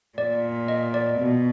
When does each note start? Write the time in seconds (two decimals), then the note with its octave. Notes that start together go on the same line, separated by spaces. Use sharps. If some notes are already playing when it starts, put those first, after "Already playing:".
0.18 A#2 D5
0.68 D#5
0.94 D5
1.19 B2